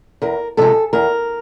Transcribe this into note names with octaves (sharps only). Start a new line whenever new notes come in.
E2 A#4
C3 F3 G#3 A4
E2 A#4